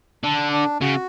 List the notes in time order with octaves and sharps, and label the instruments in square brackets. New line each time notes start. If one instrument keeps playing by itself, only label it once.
[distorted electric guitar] D3 [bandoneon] D4
[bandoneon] D4
[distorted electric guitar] C#3 [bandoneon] F#4